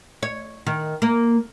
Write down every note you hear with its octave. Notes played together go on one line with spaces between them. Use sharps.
C#5
D#3
A#3